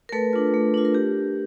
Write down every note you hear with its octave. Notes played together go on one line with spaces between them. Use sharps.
A#4
A3 A4 B4
D4 F4
A3
D4 F4
A#4
G4